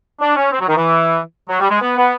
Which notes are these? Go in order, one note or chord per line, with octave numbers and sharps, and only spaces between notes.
D4
C#4
C4
F#3
D#3
E3
F#3
G3
G#3
B3
B3